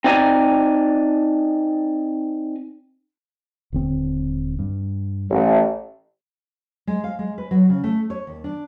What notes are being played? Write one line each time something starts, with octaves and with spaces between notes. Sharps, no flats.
C4 D#4 D5 D#5 G#5 A#5
D#1 D3 C4
G2
A1
G#3
F5
G#3
B4
F#3
C#3
A3
C#5
D#2
D4